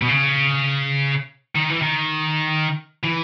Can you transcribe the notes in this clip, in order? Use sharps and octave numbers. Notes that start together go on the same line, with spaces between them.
B2
C#3
D#3
E3
D#3
E3